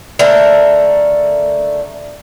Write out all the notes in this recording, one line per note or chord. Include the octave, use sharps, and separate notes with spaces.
D3 A3 A#4